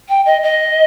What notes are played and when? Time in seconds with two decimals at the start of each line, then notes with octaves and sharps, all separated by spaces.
0.09 G5
0.26 D#5
0.43 D#5